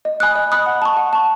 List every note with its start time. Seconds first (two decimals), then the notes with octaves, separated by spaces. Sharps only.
0.05 D#5
0.20 G#5 B5 D#6 F#6
0.36 D#5
0.52 G#5 B5 D#6 F#6
0.66 F#5
0.82 A5 C#6
0.97 F#5
1.13 A5 C#6